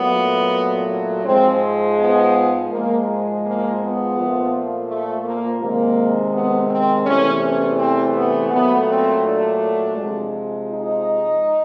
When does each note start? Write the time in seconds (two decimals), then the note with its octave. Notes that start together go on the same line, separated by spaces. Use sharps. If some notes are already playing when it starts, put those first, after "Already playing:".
Already playing: A#2 F#3 A3 B3
1.25 G#2 F3 G#3 C4
1.97 B3
2.70 G#2 F3 G#3 A#3
3.43 A#3
3.79 B3
4.15 A#2 F3 A3
4.88 A3
5.25 A#3
5.60 C3 D#3 G#3 A#3
6.32 B3
6.69 C4
7.05 E2 C3 E3 A3 C#4
7.42 C#4
7.78 C4
8.14 B3
8.50 A#2 F#3 A3 B3
8.87 C4
9.23 D4
9.96 C3 F3 G#3
10.69 D#4